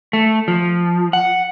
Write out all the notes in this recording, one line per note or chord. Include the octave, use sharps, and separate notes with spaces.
A3
F3
F#5